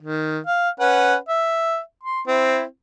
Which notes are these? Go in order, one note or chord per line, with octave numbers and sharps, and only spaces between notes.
D#3
F5
C#4 B4 F#5
E5
C6
C4 E4